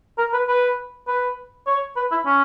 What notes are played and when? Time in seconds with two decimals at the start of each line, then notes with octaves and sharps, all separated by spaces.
0.18 A#4
0.33 B4
0.48 B4
1.08 B4
1.67 C#5
1.97 B4
2.12 E4
2.26 C#4